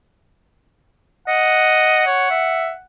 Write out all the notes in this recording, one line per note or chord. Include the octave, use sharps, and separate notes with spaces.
D#5 F#5
C#5
E5